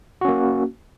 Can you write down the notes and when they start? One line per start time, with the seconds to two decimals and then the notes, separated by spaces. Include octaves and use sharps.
0.21 F#4
0.25 C#4
0.28 A#3